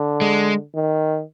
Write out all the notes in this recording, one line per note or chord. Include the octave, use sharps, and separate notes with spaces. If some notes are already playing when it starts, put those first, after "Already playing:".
Already playing: D3
G#3
D#3